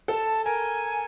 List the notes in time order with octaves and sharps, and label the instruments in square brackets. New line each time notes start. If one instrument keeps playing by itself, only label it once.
[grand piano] A4 [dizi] A5
[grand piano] A#4 [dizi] G#5